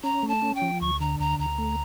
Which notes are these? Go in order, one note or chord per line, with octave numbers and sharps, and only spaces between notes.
C#4 A#5
A3
A5
C#4
G5
F3
D2 C#6
D3 A#5
D2 A#5
D2 A#5
A3